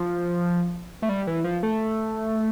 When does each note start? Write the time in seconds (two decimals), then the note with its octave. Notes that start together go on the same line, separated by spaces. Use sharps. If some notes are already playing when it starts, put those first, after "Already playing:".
Already playing: F3
1.02 A3
1.09 G3
1.27 E3
1.44 F3
1.63 A3